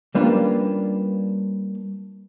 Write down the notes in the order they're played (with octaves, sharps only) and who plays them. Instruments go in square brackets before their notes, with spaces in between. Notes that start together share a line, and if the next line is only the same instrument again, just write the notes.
[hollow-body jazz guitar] G3 A#3 C#4 D4 F4 B4